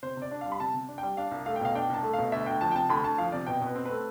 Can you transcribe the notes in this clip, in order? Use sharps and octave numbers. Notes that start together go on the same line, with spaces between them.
C3 C5
C3 D5
D4
F5
G3
B5
C3 A5
C3
D4
G3 G5
D4 F5
C2
A3 F5
G5
B2 F5
D4 G5
C2 A5
A3
B2 F5
D2 E5
D2 G5
F3 A5
G5
C3 A5
D2 B5
D2 A5
F3 F5
C3 D5
B2 G5
B2
B4
C4
A3 B4